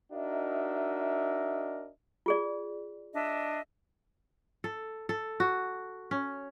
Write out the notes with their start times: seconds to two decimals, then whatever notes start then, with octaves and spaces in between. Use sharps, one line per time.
0.13 D4 D#4 F#4 A#4 D#5 E5
2.26 F4 G#4 D5
3.13 D4 D#5 E5
4.64 A4
5.09 A4
5.40 F#4
6.11 C#4